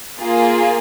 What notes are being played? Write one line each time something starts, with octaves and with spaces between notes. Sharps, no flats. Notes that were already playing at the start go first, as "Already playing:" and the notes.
A#3 F4 G#4